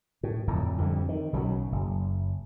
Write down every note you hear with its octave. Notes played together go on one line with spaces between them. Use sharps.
A2
D1 F2 A2
F2 D3 D#3 G3
D#3
B1 C#3 F#3
F#1